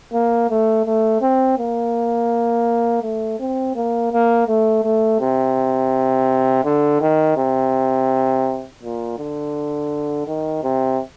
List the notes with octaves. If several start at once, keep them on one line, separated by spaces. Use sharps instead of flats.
A#3
A3
A3
C4
A#3
A3
C4
A#3
A#3
A3
A3
C3
D3
D#3
C3
A#2
D3
D#3
C3